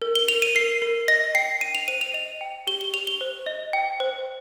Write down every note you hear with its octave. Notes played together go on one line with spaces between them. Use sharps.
A#4
G7
A#4 F7
D#7
A#4 C7
A#4
D#5 A#6
G5 C7
G5 D#7
F7
C5 D#7
F7
D#5 F7
G5
G4 G7
G7
G4 F7
G7
C5
D#5
G5
C5